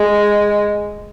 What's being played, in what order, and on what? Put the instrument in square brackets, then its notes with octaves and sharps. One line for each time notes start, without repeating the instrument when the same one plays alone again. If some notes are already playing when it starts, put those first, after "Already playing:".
Already playing: [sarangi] G#3